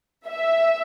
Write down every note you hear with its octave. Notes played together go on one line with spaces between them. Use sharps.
E5